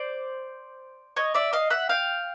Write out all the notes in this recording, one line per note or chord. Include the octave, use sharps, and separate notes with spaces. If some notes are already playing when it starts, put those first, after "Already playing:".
Already playing: C5 D5
C#5 D#5
D5 E5
D#5 F5
E5 F#5
F5 G5